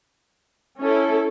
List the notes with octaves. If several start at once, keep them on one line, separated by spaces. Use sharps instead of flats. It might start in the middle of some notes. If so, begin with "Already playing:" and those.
C#4 E4 A4